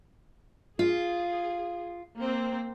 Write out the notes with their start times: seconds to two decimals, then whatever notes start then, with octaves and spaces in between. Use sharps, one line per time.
0.79 F4 G#4
2.18 A#3 C4